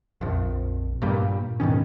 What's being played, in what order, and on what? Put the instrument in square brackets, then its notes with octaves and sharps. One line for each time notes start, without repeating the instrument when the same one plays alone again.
[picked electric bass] A#1 F2
G2 A#2 G3
G#2 B2 D#3 C#4